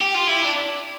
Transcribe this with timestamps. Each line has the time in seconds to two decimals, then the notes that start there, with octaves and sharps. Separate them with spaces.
0.01 G4
0.14 F4
0.27 E4
0.42 D4